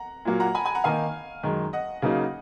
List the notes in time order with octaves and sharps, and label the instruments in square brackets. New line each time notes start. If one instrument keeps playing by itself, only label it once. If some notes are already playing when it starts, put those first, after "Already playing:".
Already playing: [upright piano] F#5 A#5
[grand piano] A#2 F#3 A#3
[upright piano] F#5 A#5
G#5 B5
G#5 B5
F#5 A#5
[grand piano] D#3 A#3 D#4 [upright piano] F5 G#5
[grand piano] F#2 D#3 G#3
[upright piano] D#5 F#5
[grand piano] C#3 F#3 A#3 D#4